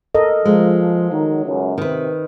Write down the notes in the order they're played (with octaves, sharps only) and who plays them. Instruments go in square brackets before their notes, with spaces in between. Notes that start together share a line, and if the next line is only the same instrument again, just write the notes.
[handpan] A4 A#4 D#5
[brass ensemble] F3 [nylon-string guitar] G#3
[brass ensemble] D#3 F#3
C#2 F#2
[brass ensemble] C3 [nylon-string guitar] D#3 B4